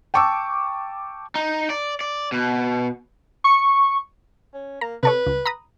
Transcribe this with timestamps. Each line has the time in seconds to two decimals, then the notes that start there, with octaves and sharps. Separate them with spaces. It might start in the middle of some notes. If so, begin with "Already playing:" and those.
0.14 G5 A5 C#6 D6 E6
1.35 D#4
1.70 D5
2.01 D5
2.32 B2
3.44 C#6
4.54 C#4
4.81 A#3 A#5
5.03 C3 A4 B4 C#5
5.26 C#2
5.45 A#5 B5 D#6